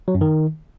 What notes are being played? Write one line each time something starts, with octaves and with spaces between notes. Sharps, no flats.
F#3
F#2
D#3